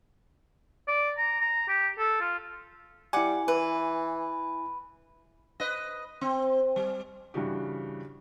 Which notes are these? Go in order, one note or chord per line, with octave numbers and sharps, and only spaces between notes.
D5
A#5
A#5
G4
A4
F4
G3 E4 F#5 G#5 D6
E3 B4
B4 D#5
C4
G3
G2 C#3 E3 D4 F#4 G4